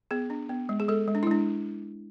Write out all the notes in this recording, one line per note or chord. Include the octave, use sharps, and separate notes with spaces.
B3 G#4
D4
B3
G#3
G#4
G#3 A4
G#3
D4
E4
G#3 D4